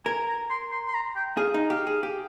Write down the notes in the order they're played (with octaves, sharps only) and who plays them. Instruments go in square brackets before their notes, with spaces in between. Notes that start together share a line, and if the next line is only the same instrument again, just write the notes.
[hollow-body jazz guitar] A#4 [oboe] G#5
[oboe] A#5
C6
C6
C6
A#5
G5
[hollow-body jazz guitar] G#4 [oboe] F5
[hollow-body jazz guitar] D#4
[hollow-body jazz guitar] G4 [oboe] F5
[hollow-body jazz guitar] G#4
G4